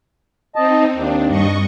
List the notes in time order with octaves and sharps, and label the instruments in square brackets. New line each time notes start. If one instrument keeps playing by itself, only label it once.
[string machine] C4 D#4 [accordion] D#5 A5
[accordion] D#2 [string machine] D4
[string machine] G2 D#5 C#6